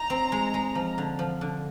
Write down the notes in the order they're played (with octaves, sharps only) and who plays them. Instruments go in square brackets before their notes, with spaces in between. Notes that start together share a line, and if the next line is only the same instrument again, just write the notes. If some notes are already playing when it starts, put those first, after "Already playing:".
Already playing: [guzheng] D#4 [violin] A#5
[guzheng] C4
G#3
G#3
F3
D3
F3
D3